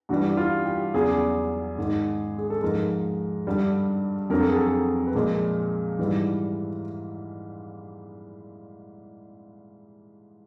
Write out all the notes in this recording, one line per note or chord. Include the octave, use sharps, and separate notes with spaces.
G2 E3 G3 F#4
F4
G4
E2 C#3 F#3 G#4
G#2 D#3 G#3
G#4
A4
G#2 F3 G#3 A#4
G2 D3 G3
F2 D3 F#3 A#4
A4
G#4
A4
B4
A#2 F3 G#3 A#4
G#2 E3 G3